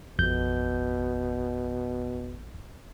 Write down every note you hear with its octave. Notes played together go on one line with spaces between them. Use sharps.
A1 F2 B2 G6